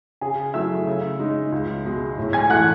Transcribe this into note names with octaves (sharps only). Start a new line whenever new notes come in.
C#3 G#4 G#5
F#3 A3 E4 E5 E6
C#3
G#3 D#4
C#2
B2 G#3
A2
G#5 G#6
E3 A3 F#5 F#6